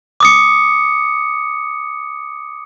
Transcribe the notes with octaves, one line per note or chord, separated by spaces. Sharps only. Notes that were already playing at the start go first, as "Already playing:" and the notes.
D6 D#6 C#7